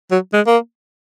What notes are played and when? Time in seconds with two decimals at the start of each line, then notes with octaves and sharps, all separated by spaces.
0.11 F#3
0.34 G#3
0.47 A#3